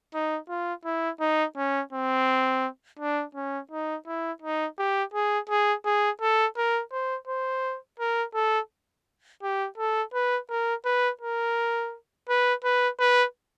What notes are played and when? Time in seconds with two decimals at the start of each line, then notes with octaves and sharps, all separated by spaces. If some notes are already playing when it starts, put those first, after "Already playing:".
0.14 D#4
0.49 F4
0.85 E4
1.20 D#4
1.56 C#4
1.93 C4
2.99 D4
3.35 C#4
3.71 D#4
4.07 E4
4.42 D#4
4.78 G4
5.14 G#4
5.49 G#4
5.85 G#4
6.21 A4
6.57 A#4
6.92 C5
7.27 C5
7.99 A#4
8.35 A4
9.43 G4
9.78 A4
10.14 B4
10.50 A#4
10.85 B4
11.21 A#4
12.29 B4
12.64 B4
13.00 B4